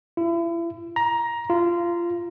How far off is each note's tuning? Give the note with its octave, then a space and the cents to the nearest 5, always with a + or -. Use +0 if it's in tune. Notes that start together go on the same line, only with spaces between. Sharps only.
E4 +35
A#5 +15
F4 -20